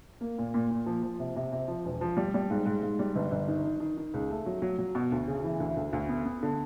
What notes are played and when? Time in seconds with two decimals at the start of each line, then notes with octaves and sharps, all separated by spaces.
0.21 A#3
0.38 A#2
0.54 A#2
0.71 A#2
0.86 F3
1.03 F3
1.19 C3
1.36 C3
1.52 C3
1.68 F3
1.85 E1
2.01 F3
2.17 G3
2.34 G3
2.50 G#2
2.66 G#2
2.83 G#2
2.99 G3
3.16 G1
3.31 G1
3.48 D#3
3.65 D#3
3.80 D#3
3.97 D#3
4.14 C#2
4.30 A3
4.46 F#3
4.62 F#3
4.78 F#3
4.95 B2
5.12 D2
5.27 C#3
5.44 E3
5.60 D2
5.77 D2
5.93 D2
6.09 B3
6.25 B3
6.43 D3